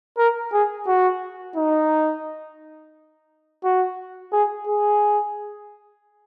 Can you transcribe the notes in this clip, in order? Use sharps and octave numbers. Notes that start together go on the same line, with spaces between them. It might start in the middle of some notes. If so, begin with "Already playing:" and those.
A#4
G#4
F#4
D#4
F#4
G#4
G#4